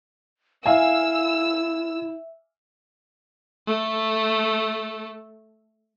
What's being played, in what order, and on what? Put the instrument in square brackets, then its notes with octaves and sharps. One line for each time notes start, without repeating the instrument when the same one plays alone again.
[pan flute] E4 [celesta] E5 [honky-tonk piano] F5 G#5 [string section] E6
[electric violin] A3 A4